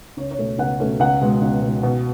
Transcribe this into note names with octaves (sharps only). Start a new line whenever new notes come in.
C#2 C#5
C#5
B2 A3 C#4
C#2 F#5
B2 A3 C#4
C#2 F#5
B2 G#3
C#2
B2 G#3
B2